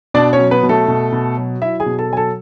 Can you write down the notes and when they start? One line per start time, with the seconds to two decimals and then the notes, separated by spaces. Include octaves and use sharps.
0.14 B2 D4 D5
0.33 C#4 C#5
0.39 F#3
0.51 B3 B4
0.63 B2
0.69 A3 A4
0.88 B2
1.12 B2
1.37 F#3
1.62 F#3 E4 E5
1.80 G#4 G#5
1.86 B2
1.99 A4 A5
2.11 F#3 G#5
2.17 A4 A5